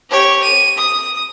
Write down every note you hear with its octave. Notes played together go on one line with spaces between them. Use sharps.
G4 C#5
D#7
D#6